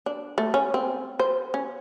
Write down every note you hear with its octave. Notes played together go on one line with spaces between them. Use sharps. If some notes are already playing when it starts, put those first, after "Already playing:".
D4
A3
C#4
C4
C5
C#4